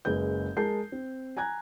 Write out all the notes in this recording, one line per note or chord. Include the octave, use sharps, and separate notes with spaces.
F#1 G#3 B4 G6
G#3 A#4 A5 G6 C7
C4
G#5 A#5 F#6 G#6